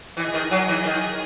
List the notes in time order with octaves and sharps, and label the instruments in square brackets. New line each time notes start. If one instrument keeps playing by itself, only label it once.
[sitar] E3 [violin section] G#4 D#5 G#5
[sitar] D#3
F#3
E3
D#3